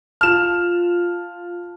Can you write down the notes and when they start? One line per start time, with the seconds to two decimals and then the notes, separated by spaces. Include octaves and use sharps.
0.21 F4 A5 F6 E7